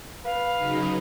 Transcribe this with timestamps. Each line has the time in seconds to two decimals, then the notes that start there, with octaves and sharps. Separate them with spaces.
0.25 B4 F5
0.57 C#3 F#3 D#4